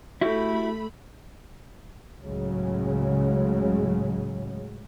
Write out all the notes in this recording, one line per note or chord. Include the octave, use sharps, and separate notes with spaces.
A3 E4 F#4 G4 B5
C#2 A2 C#3 F#3 G#3